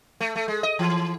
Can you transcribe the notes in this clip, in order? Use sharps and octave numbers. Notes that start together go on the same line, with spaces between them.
A3
A3
G#3
D#5
E3